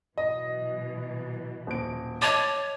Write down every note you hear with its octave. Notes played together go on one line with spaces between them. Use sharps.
B2 E3 F#3 D#5
D#1 D7
C#5 D#5 A5 D6 A6 D#7